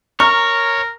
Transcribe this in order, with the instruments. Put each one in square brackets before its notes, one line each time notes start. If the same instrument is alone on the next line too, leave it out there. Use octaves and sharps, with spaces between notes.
[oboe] A#4 [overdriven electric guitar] C#5 [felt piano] A#5 F6 C#7 [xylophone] C#6